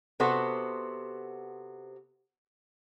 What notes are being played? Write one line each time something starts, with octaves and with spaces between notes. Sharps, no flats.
C3 B3 F#4 A4 C5